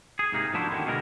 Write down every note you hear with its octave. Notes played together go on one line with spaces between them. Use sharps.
G#4
G#2 C3 A#3 D#4 G#4
F3 A#3 D4 E4 F#4 C5
D3 D#3 C#4 G4
B2 D3 D#3 G3 G#3 A#4